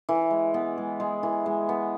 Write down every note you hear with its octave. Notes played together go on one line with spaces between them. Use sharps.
E3
G#3
B3
G#3
G#3
E3
G#3
B3